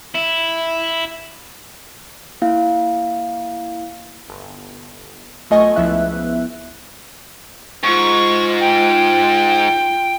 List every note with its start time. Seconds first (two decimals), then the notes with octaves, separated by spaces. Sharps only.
0.15 E4
2.42 A#3 E4 F5
4.28 G1
5.50 B1 A3 F4 D#5 G#5 C#6
5.76 C#2 F3 B3 E4 E5 F#6
7.84 G#2 F4 C#6
8.61 G5